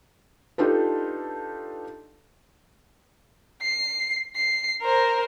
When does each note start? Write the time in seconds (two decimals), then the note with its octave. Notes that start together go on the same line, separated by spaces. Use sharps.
0.58 D4 D#4 F4 G4 A4 B4
3.62 C7
4.36 C7
4.81 A#4 C5